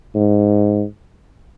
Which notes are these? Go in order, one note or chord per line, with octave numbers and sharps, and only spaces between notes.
G#2